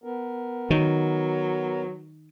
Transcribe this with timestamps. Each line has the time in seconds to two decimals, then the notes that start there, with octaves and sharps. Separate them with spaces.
0.04 B3 A#4
0.70 D#3 F#3